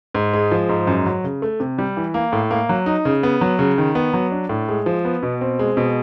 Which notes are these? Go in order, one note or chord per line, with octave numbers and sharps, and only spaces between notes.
G#2
G#3
F3
G#2
F#2
F#3
C#3
A3
C3
G3
E3
A#3
A2
A#3
F#3
D#4
C#3
B3
F#3
C#3
D#3
B3
F#3
D4
A2
G#3
F3
B3
B2
C4
G#3
B2